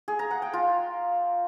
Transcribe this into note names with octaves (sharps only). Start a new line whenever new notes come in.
G#4
A#5
F#5
G5
F4